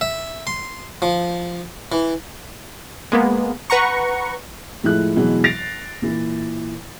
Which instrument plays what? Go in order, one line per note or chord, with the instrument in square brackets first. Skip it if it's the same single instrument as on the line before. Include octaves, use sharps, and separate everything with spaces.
[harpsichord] E5
C6
F3
E3
[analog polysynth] G#3 A#3 B3
B4 F#5 A#5 C#6
[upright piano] A2 F3 G#3 E4 F#6
B2 E3 F#3 G#3
A6 A#6 C7 D7 F7
A#2 E3